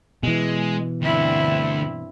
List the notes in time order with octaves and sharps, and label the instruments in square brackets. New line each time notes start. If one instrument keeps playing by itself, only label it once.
[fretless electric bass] B2 E3 [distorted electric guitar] G#3
[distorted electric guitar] D2 [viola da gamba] G2 C4 E4